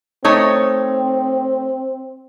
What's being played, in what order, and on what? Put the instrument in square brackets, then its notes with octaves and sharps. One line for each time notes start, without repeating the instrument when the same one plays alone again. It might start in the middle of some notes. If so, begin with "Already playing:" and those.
[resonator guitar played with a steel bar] A3 D#4 C#5 [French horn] C4